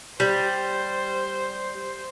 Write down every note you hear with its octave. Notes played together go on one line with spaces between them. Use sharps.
G3 C5